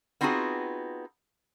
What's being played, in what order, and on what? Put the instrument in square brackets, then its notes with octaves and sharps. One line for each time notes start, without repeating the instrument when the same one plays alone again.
[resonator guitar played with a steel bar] B3 C4 D#4 F4 F#4 G#4